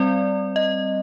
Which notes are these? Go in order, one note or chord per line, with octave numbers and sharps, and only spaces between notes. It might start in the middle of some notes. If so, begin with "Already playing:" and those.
Already playing: G3 C4 D5
D#5